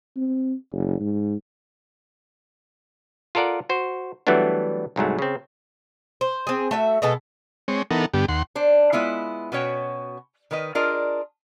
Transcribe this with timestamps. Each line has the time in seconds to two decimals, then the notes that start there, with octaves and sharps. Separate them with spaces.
0.16 C4
0.72 F#1
1.00 G#2
3.35 F4 A4 A#4 D5 F#5
3.69 F#4 C5
4.27 E3 F#3 G3 A3 B3 D4
4.96 C2 G#2 F#3 A3
5.19 C#3 C4
6.21 C5
6.47 C4 G#4
6.71 A3 F#4 E5
7.02 B2 G#3 B3 A4
7.68 G#3 C4 C#5
7.91 E3 B3 D#4 A4 A#4 F#5
8.14 G2 D3 B3 G4
8.28 D#2 F#5 C6
8.55 D4 C5
8.92 G#3 B3 E4 F4
9.52 B2 B3 C#4 F#4 C#5 G5
10.51 D#3 A#4 B4 D#5
10.75 D4 F4 G#4 A#4 D#5